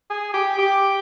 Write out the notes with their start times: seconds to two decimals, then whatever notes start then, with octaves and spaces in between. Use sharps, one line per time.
0.10 G#4
0.34 G4
0.58 G4